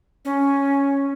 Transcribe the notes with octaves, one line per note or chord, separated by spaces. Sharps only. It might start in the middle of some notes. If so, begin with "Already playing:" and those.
C#4